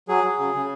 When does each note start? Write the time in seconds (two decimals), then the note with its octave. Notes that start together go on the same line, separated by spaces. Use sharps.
0.08 F#3 G#4
0.24 F#3
0.39 C#3
0.55 C#3